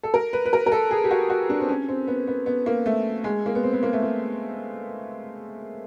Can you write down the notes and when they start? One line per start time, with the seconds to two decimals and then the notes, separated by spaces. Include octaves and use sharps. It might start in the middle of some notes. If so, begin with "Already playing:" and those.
0.03 A4
0.14 A#4
0.33 B4
0.46 B4
0.53 A#4
0.66 A#4
0.72 A4
0.91 G#4
1.04 G4
1.11 F#4
1.30 F#4
1.50 D4
1.60 C4
1.69 C#4
1.88 C4
2.07 B3
2.27 B3
2.46 B3
2.66 A#3
2.86 A3
3.24 G#3
3.46 A#3
3.55 B3
3.63 C4
3.73 B3
3.83 A#3
3.93 A3
4.02 A#3